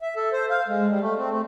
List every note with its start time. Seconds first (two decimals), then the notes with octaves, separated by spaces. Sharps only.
0.01 E5
0.16 A4
0.32 C5
0.50 F5
0.68 G#3
0.89 G3
1.01 A3
1.17 C4
1.31 A3